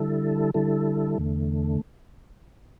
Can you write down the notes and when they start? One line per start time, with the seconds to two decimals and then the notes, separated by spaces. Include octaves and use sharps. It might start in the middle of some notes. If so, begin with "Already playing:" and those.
Already playing: D3 G3 E4 A4
0.54 D3 G3 E4 A4
1.18 E2 D3 A3